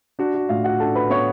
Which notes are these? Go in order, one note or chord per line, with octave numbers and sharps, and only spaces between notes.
D4 F#4
F#4
A2 F4 F5
F#4 F#5
D4 A4 A5
B4 B5
B3 C#5 C#6